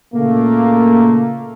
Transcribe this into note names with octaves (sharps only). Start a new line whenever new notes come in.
A#2 C#3 A3 A#3